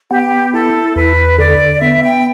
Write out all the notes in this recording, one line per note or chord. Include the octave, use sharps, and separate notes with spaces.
B3 G4
E4 A4
E2 B4
D3 D5
B3 E5
G5